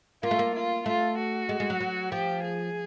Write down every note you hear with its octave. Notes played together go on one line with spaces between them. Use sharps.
A#3 F4
A3
A#3
F4
A3 F4
F#4
G#3
G#3
F#3
F#3
F3 G4
G#4